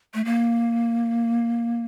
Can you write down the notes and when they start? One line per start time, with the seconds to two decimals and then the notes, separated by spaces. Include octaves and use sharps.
0.14 A3
0.25 A#3